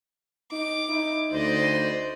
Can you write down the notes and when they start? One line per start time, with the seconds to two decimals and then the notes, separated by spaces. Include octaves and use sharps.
0.52 D#4 D6
0.89 D#4 E4
1.32 D2 C5 D5 D#5